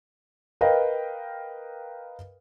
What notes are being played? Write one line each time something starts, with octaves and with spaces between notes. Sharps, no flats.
A#4 B4 D#5 F5 G5